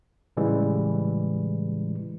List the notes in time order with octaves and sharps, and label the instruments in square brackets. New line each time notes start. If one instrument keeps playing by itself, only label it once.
[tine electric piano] A2 C#3 E3 G3 G#3